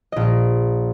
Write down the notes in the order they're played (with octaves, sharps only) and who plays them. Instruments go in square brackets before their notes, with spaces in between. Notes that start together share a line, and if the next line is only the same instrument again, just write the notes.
[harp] A#1 D#5